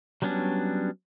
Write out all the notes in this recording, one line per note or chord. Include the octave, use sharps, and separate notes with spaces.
F#3 G3 B3 C#4 D4